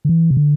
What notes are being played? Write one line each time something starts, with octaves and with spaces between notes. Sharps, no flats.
D3
E3
C3
D3